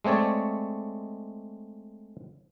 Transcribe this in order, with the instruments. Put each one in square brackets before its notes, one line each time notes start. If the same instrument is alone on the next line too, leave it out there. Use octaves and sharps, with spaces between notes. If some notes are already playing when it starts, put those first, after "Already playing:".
[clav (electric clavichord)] G#3 A3 C4 C#5 D5